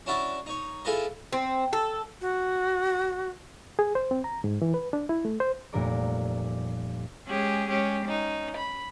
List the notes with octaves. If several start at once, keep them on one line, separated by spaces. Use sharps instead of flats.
C#4 D4 E4 F#4 E5 A5
D#4 C#5
E4 F4 G#4 A4 B4 D#5
C4
A4
F#4
G#4
C5
C4
A#5
G#2
E3
B4
D4
E4
A3
C5
F1 A#2 G3 A#4 D5 D6
G#3 C#4 G4 G#4
G#3 C#4 G4
C#4 D#4
B5